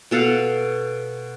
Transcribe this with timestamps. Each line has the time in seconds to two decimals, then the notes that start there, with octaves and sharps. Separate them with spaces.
0.11 B2 A4 F5 F#5